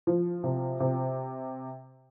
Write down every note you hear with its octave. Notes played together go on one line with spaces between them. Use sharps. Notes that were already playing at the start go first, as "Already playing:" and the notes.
F3
C3
C3